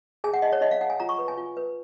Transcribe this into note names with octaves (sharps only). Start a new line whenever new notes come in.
G#4 G#5
F#5
D#4 D#5
C#5
D#4 D#5
F5
D#4 F#5
G#5
F4 A#5
C#6
B4
G#5
F4
B4